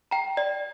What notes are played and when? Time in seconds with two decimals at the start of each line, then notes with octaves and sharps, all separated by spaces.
0.11 G5 A#5
0.37 D5